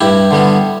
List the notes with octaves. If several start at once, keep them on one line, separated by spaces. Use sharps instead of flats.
G2 E4 G4
D3 G3 B3